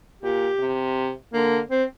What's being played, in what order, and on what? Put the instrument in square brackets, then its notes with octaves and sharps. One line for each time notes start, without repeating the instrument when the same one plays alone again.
[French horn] A#2 [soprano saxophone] G4
[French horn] C3
[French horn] D3 [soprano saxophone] A#3
[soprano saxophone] C4